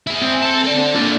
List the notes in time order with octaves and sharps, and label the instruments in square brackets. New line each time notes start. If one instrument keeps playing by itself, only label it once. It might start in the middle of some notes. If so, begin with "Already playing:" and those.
[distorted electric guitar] E4 G#4
[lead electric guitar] C4
[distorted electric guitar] A4 A5
A4 D5
[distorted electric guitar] A#3 D4 [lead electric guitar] F4 D5